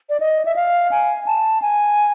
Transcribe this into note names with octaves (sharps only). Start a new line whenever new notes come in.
D5
D#5
E5
F5
G#5
A5
G#5